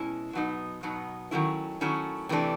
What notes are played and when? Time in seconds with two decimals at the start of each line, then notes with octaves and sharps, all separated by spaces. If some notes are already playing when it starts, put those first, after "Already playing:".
Already playing: B2 G#3 C#4 E4
0.33 B2 F#3 B3 D#4
0.83 B2 F#3 B3 D#4
1.31 D#3 F#3 A3 C#4 E4
1.81 D#3 F#3 A3 C#4 E4
2.29 C3 E3 A3 D4